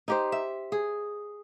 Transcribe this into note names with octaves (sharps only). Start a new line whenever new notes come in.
D#4 G4 C5
E5
G#4